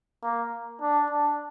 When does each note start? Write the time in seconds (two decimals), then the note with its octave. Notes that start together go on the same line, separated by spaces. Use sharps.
0.23 A#3
0.82 D4
1.10 D4